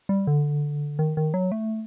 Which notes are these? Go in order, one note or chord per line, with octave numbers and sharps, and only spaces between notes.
G3
D3
D#3
D#3
F#3
A3